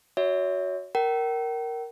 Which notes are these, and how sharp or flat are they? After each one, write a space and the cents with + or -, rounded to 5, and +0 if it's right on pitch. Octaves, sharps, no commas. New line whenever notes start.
F#4 +0 C#5 +25 E5 -25
A#4 +0 G5 -40